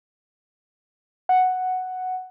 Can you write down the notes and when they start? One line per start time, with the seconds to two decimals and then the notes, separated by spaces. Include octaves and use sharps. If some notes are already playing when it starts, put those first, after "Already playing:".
1.29 F#5